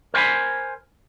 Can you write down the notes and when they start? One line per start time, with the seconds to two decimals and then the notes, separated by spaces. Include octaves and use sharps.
0.14 A#4 C5 G5 G#5 B5